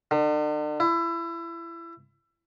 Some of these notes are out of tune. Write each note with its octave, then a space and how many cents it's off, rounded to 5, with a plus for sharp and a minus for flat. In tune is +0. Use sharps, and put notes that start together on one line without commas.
D3 +45
E4 +25